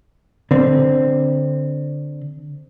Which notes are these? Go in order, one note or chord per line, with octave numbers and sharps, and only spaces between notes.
D3 C4